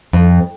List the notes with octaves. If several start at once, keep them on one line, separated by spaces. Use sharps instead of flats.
F2